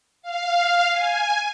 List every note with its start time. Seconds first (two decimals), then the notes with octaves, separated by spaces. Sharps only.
0.22 F5
0.92 G#5